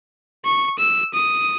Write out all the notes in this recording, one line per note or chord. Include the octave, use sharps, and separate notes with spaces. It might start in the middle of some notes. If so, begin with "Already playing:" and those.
C#6
E6
D#6